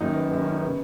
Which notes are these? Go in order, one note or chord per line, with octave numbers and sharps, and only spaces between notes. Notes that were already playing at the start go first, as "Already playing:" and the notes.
F#2 D#3 D#4
B3
F#2 D#3 B3
C#4
D#4
C#3 B3